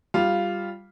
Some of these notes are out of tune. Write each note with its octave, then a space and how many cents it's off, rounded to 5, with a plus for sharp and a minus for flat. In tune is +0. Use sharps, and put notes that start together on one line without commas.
G3 +0 F4 -5 F5 +0